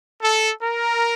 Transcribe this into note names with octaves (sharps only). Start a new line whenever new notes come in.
A4
A#4